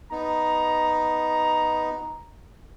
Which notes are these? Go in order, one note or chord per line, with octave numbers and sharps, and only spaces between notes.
B3 D#4 A#5